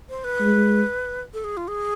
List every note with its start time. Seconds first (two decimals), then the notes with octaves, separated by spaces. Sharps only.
0.09 C5
0.24 B4
0.40 G#3
1.34 A4
1.44 G#4
1.57 F4
1.68 G#4